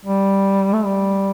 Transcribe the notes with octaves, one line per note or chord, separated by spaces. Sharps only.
G3
A3
G3